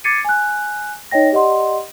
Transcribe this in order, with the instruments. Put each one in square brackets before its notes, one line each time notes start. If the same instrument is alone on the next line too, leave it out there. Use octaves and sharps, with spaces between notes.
[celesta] D6 G#6 A6 C7 C#7 D#7
G#5 F#6
D#4 C#5 D#5 G5 A#6
G4 D5 D#5 F#5 C6